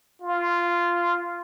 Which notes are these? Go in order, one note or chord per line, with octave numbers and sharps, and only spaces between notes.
F4